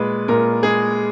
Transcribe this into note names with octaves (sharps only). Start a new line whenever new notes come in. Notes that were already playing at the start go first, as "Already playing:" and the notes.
Already playing: A#2 G#3 B4
A#2 A#4
G#3 G#4